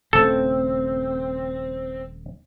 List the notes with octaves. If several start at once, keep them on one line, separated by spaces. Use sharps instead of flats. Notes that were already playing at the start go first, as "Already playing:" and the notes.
D#1 C#3 A3 C4 A4